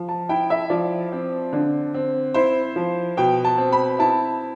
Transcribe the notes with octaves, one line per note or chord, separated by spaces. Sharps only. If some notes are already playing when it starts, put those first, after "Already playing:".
Already playing: F3
A5
E4 G5
E5
F3 D5
C4
D3
C4
E4 C5
F3
B2 G5
A5
C4
B5
E4 A5